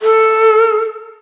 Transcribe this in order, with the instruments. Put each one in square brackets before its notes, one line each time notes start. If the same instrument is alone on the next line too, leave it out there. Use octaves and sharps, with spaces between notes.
[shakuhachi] A4